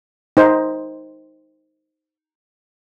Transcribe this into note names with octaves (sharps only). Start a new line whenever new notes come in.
D#4 C5